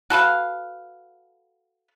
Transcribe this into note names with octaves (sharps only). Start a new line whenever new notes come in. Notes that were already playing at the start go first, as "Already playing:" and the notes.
F#4 A4 B4 F5